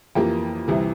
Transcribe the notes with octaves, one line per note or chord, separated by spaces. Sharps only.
F2 E3 A#3 G4
C2 C3 E3